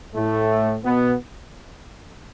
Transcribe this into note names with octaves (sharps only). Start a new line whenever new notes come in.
A2 A3
B2 B3